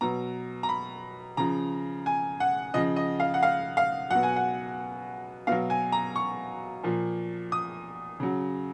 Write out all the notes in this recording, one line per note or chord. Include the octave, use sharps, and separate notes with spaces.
B2 F#3 A#5
A#5
B5
C#3 F3 A#5
G#5
F#5
C#3 F3 D#5
D#5
F5
F#5
F5
F5
B2 F#3 F#5
G#5
F#5
B2 F#3 F5
G#5
A#5
C#6
A#2 F3
D#6
C#3 F#3